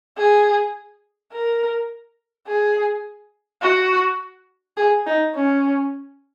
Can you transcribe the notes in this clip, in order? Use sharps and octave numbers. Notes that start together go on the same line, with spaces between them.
G#4
A#4
G#4
F#4
G#4
D#4
C#4